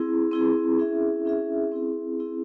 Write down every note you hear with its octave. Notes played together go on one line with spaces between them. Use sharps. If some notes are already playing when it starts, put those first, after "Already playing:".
Already playing: C4 E4 G#4
C4 E4 G#4
C#4 E4 G#4 E5
C#4 E4 G#4 E5
C4 E4 G#4
C4 E4 G#4